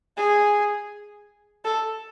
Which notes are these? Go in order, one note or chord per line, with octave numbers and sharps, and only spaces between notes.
G#4
A4